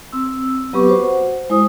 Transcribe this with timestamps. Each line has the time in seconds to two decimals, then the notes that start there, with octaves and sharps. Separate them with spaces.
0.13 C4 E6
0.73 F#3 B3 G4 B4 C#6 D6
0.88 F#4 C5 F#5
1.50 G#3 E4 C5 D#6